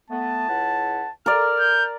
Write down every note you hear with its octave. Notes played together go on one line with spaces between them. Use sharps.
A3 B3 A5
C#2 E4 F#5
A#4 D5 F6
G6